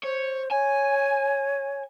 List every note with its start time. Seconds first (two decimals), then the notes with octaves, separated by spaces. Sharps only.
0.04 C5 C#5
0.51 C#5 G#5